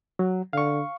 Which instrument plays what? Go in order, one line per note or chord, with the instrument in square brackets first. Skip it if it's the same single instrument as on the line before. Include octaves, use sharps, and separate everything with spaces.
[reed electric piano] F#3
[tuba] D3 [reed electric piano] F5 C#6